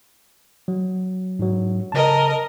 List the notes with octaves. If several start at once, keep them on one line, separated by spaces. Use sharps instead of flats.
F#3
G#2 F#3
C#3 A#4 D#5 A5